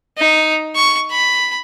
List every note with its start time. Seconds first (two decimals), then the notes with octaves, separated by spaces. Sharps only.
0.18 D#4
0.76 C#6
1.11 B5